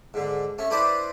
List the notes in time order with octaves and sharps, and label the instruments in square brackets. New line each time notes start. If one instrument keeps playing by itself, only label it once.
[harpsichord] G#2 D3
A3 C#4
D4 E4 B4 C5 D5